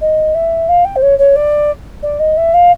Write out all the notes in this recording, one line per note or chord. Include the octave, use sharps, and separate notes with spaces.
D#5
E5
F5
G5
C5
C#5
C#5
D5
D5
D#5
E5
F5